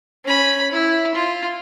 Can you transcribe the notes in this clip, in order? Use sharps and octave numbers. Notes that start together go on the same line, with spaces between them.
C#4 B5
E4
F4